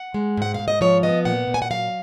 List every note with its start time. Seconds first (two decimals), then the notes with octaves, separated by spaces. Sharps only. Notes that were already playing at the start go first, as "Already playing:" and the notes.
Already playing: F#5
0.14 G#3
0.37 G#2 F#5
0.54 G#2 F5
0.68 D#5
0.81 F3 C#5
1.03 B3 D#5
1.25 A#2 F#5
1.47 A#2
1.54 G#5
1.62 F#5
1.70 F#3 F5